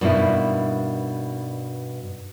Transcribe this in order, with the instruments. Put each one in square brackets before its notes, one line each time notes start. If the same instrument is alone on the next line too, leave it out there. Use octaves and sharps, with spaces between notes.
[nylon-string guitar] G2 B2 A#3 D#4 E4